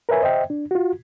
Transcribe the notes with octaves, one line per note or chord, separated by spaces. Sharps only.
A#4 B4 C#5 E5 G#5
C5 D#5 E5 G5
D4
F4 F#4